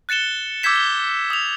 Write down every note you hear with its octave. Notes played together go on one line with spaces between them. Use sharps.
F#6 A6 C#7 E7 G7
D6 E6 G6 G#6 B6 E7
G7
D#6 F7